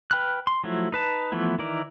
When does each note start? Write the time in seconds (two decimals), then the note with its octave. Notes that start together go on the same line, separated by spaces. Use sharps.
0.11 B4 G5 B5 F6 F#6
0.47 C6
0.64 F3 F#3 A3 E4
0.92 D#4 B4 A5
1.32 E3 F3 A3 B3 E4
1.59 D#3 E3 E4 A#4 D5